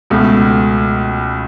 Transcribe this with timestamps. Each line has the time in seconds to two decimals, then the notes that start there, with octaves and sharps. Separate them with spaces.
0.10 C#2 B2 A3